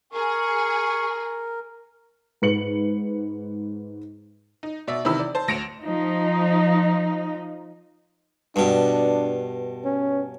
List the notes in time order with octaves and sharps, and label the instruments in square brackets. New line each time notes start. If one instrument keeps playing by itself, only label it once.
[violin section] G#4 [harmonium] A#4 [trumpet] C#6
[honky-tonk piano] G#2 B4 C#7 F#7
D#4
B2 D5 E5
C3 D#3 E3 B5 E6
D5
C5 A5
D2 A#6 C#7 D7 E7 F7
[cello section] F3 D#4
[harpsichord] G2 B2 [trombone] D4
[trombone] C#4